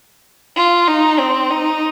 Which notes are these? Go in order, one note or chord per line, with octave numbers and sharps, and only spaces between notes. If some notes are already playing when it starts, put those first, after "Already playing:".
F4
D#4
C4
D#4